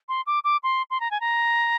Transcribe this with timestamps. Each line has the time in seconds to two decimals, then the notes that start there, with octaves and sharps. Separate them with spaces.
0.09 C6
0.27 D6
0.44 D6
0.63 C6
0.90 C6
1.00 A#5
1.11 G#5
1.20 A#5